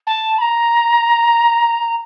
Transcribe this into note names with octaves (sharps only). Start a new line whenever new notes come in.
A5
B5
A#5